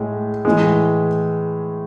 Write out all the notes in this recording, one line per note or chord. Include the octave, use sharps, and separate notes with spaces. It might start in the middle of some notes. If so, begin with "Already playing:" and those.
Already playing: A2 G#3
A2 E3 G#3